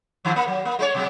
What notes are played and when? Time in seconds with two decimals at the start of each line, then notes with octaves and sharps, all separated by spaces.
0.25 G#2 D#3 F3
0.36 A#3
0.48 F#3
0.65 A#3
0.79 G#3 G4 C#5
0.94 B2 F#3 G#3